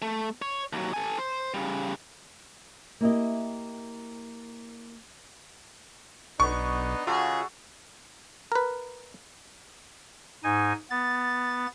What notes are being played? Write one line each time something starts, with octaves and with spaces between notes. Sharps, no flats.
A3
C#5
D#2 F#3
A4 G#5
C5
C#3 G3
A#3 E4 G4 D#5
B1 B3 D4 D#4 C#6
C#3 G#3 F4 F#4 G#4 A4
A#4 B4
G#2 D#4 G#5
B3 A6